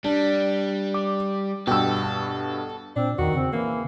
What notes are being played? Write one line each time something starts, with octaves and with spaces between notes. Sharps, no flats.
G3 D4
D6
G2 B2 A4 G5 E6
A5
A#2 C4 D4
E2 D#3 F#4
C#3 C4
E3 A#3